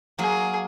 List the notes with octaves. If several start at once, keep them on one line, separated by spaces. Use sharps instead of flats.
F#3 A#3 G#4